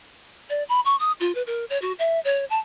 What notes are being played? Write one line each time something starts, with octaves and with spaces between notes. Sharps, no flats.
D5
B5
C#6
D#6
F4
B4
A#4
C#5
F#4
E5
C#5
A5